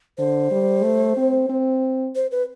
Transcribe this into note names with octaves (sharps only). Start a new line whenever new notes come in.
D3 C5
G3
A3
C4
C4
C5
B4